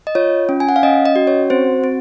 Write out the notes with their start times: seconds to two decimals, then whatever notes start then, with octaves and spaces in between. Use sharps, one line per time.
0.07 D#5
0.15 F4 C#5
0.49 C#4
0.60 G#5
0.69 F#5
0.76 F5
0.83 C#4 D#5
1.06 D#5
1.16 F#4
1.27 C#5
1.50 C4 C5
1.84 C4